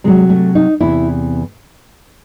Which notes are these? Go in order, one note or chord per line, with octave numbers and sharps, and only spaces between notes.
C3 F#3 G#3
A3
D#4
E2 C3 E3 E4